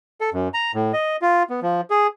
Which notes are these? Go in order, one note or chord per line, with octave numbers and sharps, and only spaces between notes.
A4
F#2
A#5
A2
D#5
F4
B3
F3
G#4